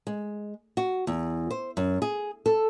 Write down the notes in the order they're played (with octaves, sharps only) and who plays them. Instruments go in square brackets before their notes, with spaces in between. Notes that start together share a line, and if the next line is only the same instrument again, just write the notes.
[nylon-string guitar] G#3
F#4
E2
C5
F#2
G#4
A4